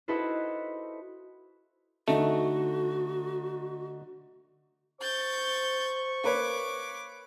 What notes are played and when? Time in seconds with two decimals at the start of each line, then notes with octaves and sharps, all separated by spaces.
0.08 D#4 E4 F#4 A4 B4 C5
2.08 D3 A3 D#4 F#4
5.01 C5 C#6 G6 A6
6.24 A#3 B4 C#5 D6